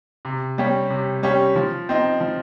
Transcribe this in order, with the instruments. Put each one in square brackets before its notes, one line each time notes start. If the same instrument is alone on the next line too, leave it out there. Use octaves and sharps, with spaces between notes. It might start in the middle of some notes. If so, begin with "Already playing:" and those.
[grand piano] C3
G3 C#4 G4
C3
G3 C#4 G4
F3
C4 D#4
F3